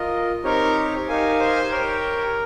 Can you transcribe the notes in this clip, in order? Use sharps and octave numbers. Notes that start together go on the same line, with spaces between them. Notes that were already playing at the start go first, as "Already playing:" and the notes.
Already playing: F4 A#4 D#5
C4 D#4 G4 A#4 C#5
D#4 G4 A#4 F5 G#5
C5
G4 A#4 C#5 G5